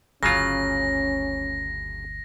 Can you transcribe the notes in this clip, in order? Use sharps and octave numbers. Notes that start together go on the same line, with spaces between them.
G1 D2 C#3 F#3 C#4 F4 A#6